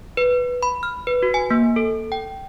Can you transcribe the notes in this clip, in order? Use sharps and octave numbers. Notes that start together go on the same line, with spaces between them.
B4
B5
F6
B4
F#4
G#5
A#3
A4
G5